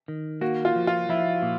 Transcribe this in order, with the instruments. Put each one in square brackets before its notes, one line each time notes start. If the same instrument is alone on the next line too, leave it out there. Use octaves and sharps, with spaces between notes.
[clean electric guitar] D#3
[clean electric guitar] A#3 [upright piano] F#4
[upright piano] F4
[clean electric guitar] F3
[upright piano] F4
[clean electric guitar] F3 [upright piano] E4
[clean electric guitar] A#2